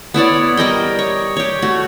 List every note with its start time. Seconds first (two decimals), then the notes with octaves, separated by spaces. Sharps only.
0.14 B3 E4 C#5 D5
0.57 G3 A#4 D#5 G5
0.99 C#5
1.37 G4 C#5
1.62 A3 F#4